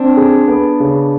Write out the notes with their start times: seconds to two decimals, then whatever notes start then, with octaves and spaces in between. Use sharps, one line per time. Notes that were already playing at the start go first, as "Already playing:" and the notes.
Already playing: C4 D4
0.17 G#4
0.48 B3
0.80 C#3